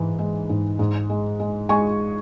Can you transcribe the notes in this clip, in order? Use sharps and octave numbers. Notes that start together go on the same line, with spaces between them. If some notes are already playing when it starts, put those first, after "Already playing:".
Already playing: G#2 E3
G#3
G#2
G#2
G#3
G#3
G#3 G#5 C#6